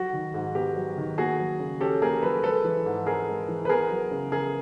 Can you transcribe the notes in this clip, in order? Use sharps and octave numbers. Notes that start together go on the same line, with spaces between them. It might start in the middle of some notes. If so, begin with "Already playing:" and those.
Already playing: F#3 F#4
D#3
G#2
B3 G4
F#3
D#3
A#3 F#4 G#4
F#3
C#3
C#4 G4 A4
A#3 G#4 A#4
F#3 A4 B4
G#3 A4 B4
E3
G#2
C4 G#4 A#4
G#3
E3
B4
B3 G#4 A#4
F#3
C#3
C#3 G#4 A#4